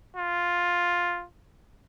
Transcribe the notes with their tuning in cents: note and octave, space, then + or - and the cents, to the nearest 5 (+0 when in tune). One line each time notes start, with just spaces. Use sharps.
F4 +5